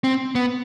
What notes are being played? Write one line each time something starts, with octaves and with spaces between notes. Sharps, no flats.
C4
B3